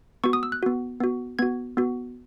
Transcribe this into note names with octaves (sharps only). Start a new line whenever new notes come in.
B3 F#4 C#6
D#6
E6
F#6
B3 F#4
B3 F#4
B3 F#4 G#6
B3 F#4